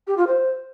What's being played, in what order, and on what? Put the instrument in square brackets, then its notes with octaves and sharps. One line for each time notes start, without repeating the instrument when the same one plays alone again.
[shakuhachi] G4
F4
C5